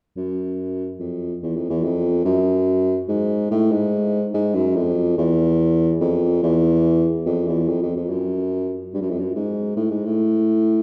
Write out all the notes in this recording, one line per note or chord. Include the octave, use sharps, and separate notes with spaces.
F#2
F2
E2
F2
E2
F2
F#2
G#2
A2
G#2
G#2
F#2
F2
E2
F2
E2
F2
E2
F2
F2
F2
F#2
G2
F#2
F2
F#2
G#2
A2
G#2
A2